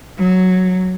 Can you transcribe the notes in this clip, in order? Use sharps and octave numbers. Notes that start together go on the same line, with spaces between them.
F#3